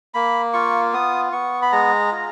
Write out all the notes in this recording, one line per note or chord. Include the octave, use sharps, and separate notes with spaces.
A#3 B5
F4 C#6
B3 D#6
B3 C#6
B5
G#3 A#5
F4